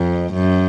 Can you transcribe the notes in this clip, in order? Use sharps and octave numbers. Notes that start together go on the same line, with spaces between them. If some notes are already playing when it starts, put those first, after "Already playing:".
Already playing: F2
F#2